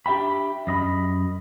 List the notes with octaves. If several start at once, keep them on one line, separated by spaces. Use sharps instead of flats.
D4 G4 E5 G5 B5
F#2 D#5 B5